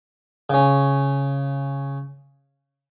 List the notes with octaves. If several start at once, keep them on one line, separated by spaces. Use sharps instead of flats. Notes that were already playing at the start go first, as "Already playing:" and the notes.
C#3 C#4